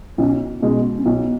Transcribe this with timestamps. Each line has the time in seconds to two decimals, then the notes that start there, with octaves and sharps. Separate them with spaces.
0.18 B1 C#4
0.62 B2 G#3 C#4
0.98 C#4
1.06 B1 B3